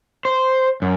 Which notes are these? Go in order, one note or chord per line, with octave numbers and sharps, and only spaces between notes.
C5
F#2